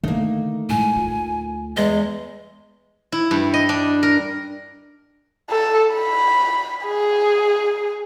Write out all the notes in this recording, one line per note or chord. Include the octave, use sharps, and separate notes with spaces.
D3 D#3 A3 A#3 D#4
A2 G#3 G#5
D2 F4
E2 G#3 D#5
E4
G2
D#5
D4
A#4
A4
B5
G#4